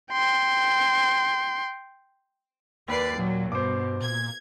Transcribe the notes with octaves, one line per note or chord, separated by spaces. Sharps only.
G5 C6
D#2 B4 D5 C7
A#2 F#3
G2 B2 C5 D6
A#2 G#6